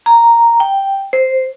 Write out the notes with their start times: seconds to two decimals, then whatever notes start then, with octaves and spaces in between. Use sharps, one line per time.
0.06 A#5
0.60 G5
1.13 C5